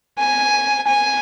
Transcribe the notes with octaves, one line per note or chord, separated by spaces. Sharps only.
G#5
G#5